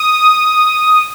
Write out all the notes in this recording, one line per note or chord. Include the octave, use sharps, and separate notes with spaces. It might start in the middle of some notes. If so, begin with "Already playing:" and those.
Already playing: D#6